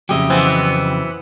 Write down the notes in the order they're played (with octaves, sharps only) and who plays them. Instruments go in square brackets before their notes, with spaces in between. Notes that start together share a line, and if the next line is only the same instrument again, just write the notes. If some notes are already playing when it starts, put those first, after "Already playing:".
[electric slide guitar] F2 C#3 F#3 [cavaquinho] G4 D#5 E5
[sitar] E3 B3 C4